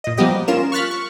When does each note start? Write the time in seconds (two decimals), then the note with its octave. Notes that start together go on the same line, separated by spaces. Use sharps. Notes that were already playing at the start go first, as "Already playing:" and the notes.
0.04 A#2 D#5
0.17 F3 G3 A#3 B3 G4 D#5
0.48 C#4 F4 A#4 E7
0.72 C#6 F6 F#6 A6 B6
0.91 C#6